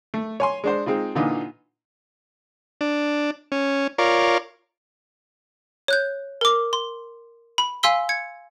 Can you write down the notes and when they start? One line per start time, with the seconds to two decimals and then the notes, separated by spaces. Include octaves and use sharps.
0.14 A3
0.40 C#5 G#5 C6
0.64 G#3 D4 C5
0.86 G#3 C4 D#4 F4
1.15 A#2 D3 E3 D#4 F4
2.81 D4
3.52 C#4
3.98 F4 A#4 C#5 D5
5.88 C#5 F#6 G6
6.41 A#4 D6
6.73 C6
7.58 B5
7.83 F5 G#5 C6 E6 B6 G7
8.09 G#6 C#7